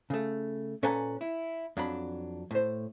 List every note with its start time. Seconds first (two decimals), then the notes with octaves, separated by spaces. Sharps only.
0.10 C#3 A3
0.83 A#2 C#4 A4 B4 G#5 A#5
1.21 E4
1.77 F2 F#3 D4 B5
2.51 A2 C5